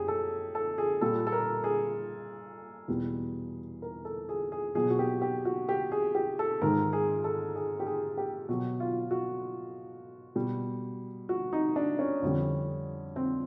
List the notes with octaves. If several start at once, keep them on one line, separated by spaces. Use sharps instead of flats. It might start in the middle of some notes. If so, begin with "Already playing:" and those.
Already playing: F#2 G4 G#4
A4
A4
G#4
A#2 G3 A4
A4
A#4
G#4
E2 B2 G3
A#4
A4
G#4
G#4
B2 F#3 G#4
F#4
G4
G4
F#4
G4
G#4
G4
A4
G#2 D#3 G#3 A#4
G#4
A4
G#4
G4
G#4
G4
B2 F#3 F#4
F4
F#4
B2 G3
F#4
D#4
D4
C#4
F2 D3 G3
C4